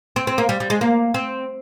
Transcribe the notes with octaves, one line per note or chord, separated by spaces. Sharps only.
C4
C4
A#3
G3
G3
G#3
A#3
C4